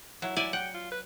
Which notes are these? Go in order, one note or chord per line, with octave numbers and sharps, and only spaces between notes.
F#3 E4
E4 D5 G#5
F#5 G5
F4
B4